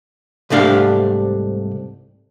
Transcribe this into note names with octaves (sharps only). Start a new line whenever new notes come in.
C2 G#2 A3 D4 G4 F5